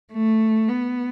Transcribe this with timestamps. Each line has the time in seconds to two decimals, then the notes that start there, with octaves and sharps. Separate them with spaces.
0.13 A3
0.68 B3